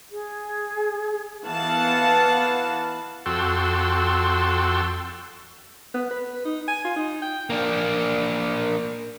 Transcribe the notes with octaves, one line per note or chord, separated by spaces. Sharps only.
G#4
E3 B3 F5 F#5 A5
F2 F#4 A4 G5 C6 E6
B3
B4
D#4
G#5
F4
D#4
G5
A#3 D4